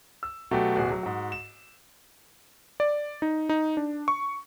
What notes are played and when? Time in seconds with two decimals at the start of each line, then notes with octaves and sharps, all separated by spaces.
0.23 E6
0.51 B2 F#3 A3 F#4 G4
0.76 D1 B2 F#4 G#4
0.91 F#3
1.03 G#2 F#4
1.32 E7
2.80 D5
3.22 D#4
3.49 D#4
3.77 D4
4.08 C#6